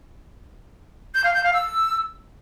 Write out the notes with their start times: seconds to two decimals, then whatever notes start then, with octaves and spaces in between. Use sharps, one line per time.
1.14 G6
1.24 F5
1.34 G6
1.43 F5
1.53 E6